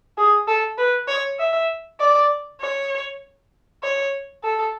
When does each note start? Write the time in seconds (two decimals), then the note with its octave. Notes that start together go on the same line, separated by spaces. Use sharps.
0.18 G#4
0.47 A4
0.78 B4
1.08 C#5
1.39 E5
2.00 D5
2.61 C#5
3.83 C#5
4.43 A4